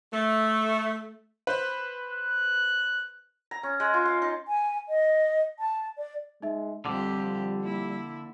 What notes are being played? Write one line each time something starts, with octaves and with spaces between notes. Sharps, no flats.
A3
B4 C5
F#6
A#5
C#4
G#3
F4
F5
D#4
G#5
D#5
A5
D5
G#3 D#4 E5
F2 D3 F3 G3 G4 D6
A#3 E4